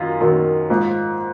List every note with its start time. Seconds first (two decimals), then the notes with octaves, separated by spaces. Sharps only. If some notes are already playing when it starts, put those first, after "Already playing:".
Already playing: F#2 D#3 F#3 F4
0.20 F#2 D#3 F#3
0.69 G#2 F3